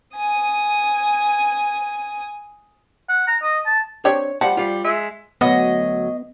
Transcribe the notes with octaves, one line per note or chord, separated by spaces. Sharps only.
G#5 D#6
F#5
A#5
D#5
A5
C4 D4 G4 C#5
F3 G3 F#5
G3 F4
G#3 E5
D2 F#3 B3 D#5 F#5